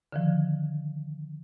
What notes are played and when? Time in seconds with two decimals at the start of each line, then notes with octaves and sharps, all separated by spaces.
0.13 D3 D#3 F3